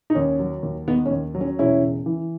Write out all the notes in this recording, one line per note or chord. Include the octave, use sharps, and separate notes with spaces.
D#4
D#2 C#4
F#3
D#2
D#3 B3
C#4
D#2
F#3
C#4
E1 C#4 E4
C#3
E3